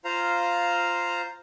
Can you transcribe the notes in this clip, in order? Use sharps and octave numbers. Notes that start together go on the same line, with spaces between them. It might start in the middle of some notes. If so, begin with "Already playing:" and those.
F4 C5 F5 A#5